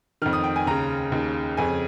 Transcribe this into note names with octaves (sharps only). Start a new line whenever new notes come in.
F2 D#3 F6
D#6
G5
G#5
D#2 C#3 A#5
D#2 C#3
F2 C#3 G#5